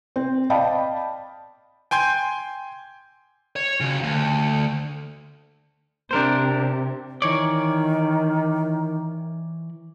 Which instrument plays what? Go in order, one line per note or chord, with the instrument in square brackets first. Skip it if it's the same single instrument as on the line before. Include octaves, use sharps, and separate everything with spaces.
[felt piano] C4
D5 D#5 F5 G5 A5 B5
[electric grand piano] G5 G#5 C6 G6 G#6
[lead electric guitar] C#5
C#3 F#4
D2
[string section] C3 [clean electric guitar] D4 A#4 C5
[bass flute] D#3 [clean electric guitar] E3 C#5 D5